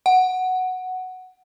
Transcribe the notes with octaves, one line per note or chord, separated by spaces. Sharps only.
F#5